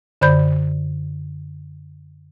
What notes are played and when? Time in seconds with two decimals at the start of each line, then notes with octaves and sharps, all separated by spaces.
0.21 F#2 D3 C5 D5 B5 G6